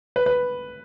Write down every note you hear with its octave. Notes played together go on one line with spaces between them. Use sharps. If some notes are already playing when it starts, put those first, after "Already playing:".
B4
B4